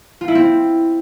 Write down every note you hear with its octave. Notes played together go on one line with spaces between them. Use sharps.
F4
E4
C4